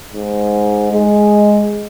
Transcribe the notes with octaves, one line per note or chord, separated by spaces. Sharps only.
G#2
G#3